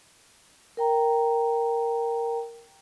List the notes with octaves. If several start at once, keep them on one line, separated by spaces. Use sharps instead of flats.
A#4 G5 A#5